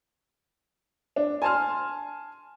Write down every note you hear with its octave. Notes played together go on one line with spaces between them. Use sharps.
D4
G#5 A5 C6 F6